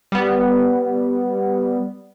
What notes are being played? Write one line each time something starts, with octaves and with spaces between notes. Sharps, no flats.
G3 B3